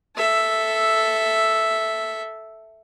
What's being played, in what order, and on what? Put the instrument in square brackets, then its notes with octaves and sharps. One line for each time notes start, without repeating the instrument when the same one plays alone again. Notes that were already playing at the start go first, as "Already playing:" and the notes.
[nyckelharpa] A4 E5